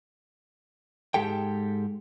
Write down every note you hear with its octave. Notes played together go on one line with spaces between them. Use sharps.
G#2 G#3 G4 A4 G5